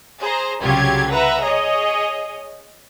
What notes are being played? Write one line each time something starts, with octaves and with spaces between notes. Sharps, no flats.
G#4 C5 A#5
C2 C#3 F#3 F4 G4 G#6
B4 E5 F#5 A#5
G#4 C#5 D#5